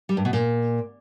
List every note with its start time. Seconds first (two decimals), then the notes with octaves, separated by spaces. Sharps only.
0.09 G3
0.17 G2
0.25 B2
0.33 A#2